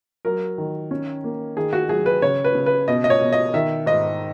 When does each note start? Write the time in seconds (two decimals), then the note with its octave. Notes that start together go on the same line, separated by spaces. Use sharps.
0.25 F#3 A#4
0.58 D#3
0.91 C#4
1.24 A#3
1.57 D#3 G#4
1.73 F#4
1.89 F#3 G#4
2.06 B4
2.22 C#3 C#5
2.44 B4
2.55 C#3
2.66 B4
2.88 B2 D#5
3.04 D#5
3.10 C#5
3.21 B2
3.33 D#5
3.54 D#3 E5
3.86 G#2 D#5